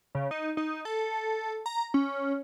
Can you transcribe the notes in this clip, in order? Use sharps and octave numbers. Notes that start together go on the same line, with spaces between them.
C#3
D#4
D#4
A4
A#5
C#4